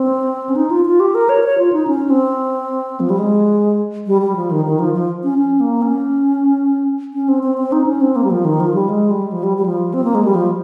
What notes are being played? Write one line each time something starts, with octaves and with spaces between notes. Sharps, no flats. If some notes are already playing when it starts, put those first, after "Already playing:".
Already playing: C4
C#4
D#4
F4
F4
G4
A#4
C#5
C#5
F4
D#4
C#4
C4
F3
G3
G#3
G3
G3
F3
D#3
D#3
F3
F3
C#4
C#4
A#3
C#4
C#4
C4
C4
C4
D#4
C#4
C4
A#3
G3
F3
D#3
F3
G3
G#3
G3
F3
G3
G3
F3
C4
A#3
G#3
G3
F3